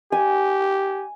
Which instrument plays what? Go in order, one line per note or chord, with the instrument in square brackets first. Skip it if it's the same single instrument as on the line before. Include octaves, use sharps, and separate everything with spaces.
[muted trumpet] G4 [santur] G#5